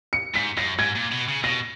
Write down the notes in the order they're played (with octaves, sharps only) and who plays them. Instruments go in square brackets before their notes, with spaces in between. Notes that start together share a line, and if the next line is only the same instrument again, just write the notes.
[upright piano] C#7
[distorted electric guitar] G#2 [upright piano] B6
[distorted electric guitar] F#2 [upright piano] A#6
[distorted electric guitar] G#2 [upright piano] G#6
[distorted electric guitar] A#2
B2
C#3
[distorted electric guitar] B2 [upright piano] A#6